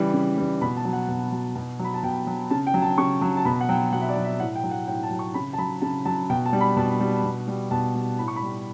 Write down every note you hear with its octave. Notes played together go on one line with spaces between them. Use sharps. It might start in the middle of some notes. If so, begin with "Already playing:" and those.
Already playing: C#3 E3 G3 B5
C#3
E3 G3
B2 B5
A5
F#3
F#5
B2
F#3
B2
F#3 B5
A5
B2 G5
F#3
C#3 A5
G5
F#3
A5
C#3 C#6
F#3
A5
B2 B5
F#5
F#3 G5
B2 F#5
E5
D5
F#3
E5
A2 F#5
G5
F#3
F#5
A2 G5
A5
F#3
C#6
C#3 B5
A5
F#3 B5
C#3 A5
F#3 A5
B2 G5
A5
G3
B5
B2 A5
G3
B2
G3
B2 A5
G3
A2 B5
C#6
B5
G3